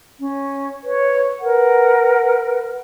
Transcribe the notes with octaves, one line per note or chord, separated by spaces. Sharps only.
C#4
B4 C#5
A#4 B4 F#5